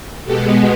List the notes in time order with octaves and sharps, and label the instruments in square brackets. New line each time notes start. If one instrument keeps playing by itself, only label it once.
[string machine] B2 G#3 B3 G4 A4